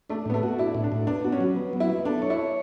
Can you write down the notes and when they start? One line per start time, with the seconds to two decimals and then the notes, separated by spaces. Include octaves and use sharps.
0.10 A3 D4
0.26 A2 B3
0.34 A3
0.43 F#4
0.59 D4 E4
0.75 A2
0.84 D4
0.92 A2
1.07 B3 D4
1.25 F#4
1.32 C#4
1.40 F#3
1.56 B3
1.73 F#3
1.80 E4
1.90 B3
2.05 D4 A4
2.22 C#5
2.30 E4
2.38 C#5